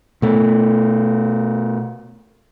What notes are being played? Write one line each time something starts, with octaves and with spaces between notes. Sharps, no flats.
B2 A3